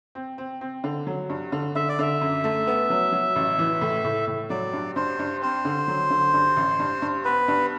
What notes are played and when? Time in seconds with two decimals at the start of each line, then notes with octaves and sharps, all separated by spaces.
0.15 C4
0.38 C4
0.61 C4
0.84 D3
1.07 F#3
1.30 G2
1.52 D3
1.76 D3 E5
1.89 D5
1.99 D3 E5
2.21 F#2
2.44 A3
2.67 B3
2.90 F#3
3.12 F#3
3.36 A1
3.59 E3
3.81 A2
4.04 A2
4.27 A2
4.50 F#3 D5
4.73 G2
4.96 G2 C5
5.19 G2
5.42 C4 C5
5.65 D3
5.88 F#3
6.11 D3
6.34 G2
6.57 A1
6.79 G2
7.02 G2
7.25 B3 B4
7.48 G2